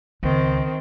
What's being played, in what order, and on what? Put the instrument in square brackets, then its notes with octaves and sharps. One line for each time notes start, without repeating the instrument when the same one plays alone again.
[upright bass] C#2 [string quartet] D#3 C4